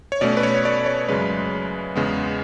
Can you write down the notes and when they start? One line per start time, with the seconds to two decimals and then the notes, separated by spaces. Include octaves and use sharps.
0.12 C#5
0.21 B2 A3 C#4 D5
0.37 B4
0.43 C#5
0.65 D5
0.86 C#5
1.09 F#2 C#3 G#3 B4
1.96 E2 C#3 G#3 B3